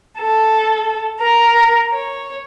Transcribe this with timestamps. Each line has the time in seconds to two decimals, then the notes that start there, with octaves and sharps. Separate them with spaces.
0.19 A4
1.20 A#4
1.91 C#5